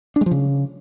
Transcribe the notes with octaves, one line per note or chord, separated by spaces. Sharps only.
D4
G#3
F3
C#3